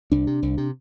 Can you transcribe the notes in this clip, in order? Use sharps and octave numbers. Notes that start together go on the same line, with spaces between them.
C2 D4
C3
C2
C3